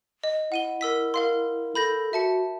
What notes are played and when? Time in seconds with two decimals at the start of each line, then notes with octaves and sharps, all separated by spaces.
0.24 D#5
0.52 E4 F#5 D#7 G7
0.81 A#4 E6 B6
1.14 A#4 F5 C6
1.75 A4 B5 G6 A#6
2.13 F#4 E5 A5 C#7